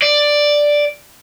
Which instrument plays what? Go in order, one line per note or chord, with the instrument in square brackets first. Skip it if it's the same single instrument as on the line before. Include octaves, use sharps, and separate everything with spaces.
[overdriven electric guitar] D5